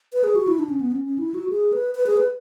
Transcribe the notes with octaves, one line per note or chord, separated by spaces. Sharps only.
B4
G#4
F#4
E4
D4
C#4
B3
C#4
C#4
E4
F#4
G#4
B4
B4
G#4
B4